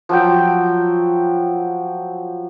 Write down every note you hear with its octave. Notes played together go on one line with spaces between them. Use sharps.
F3 F#3 G5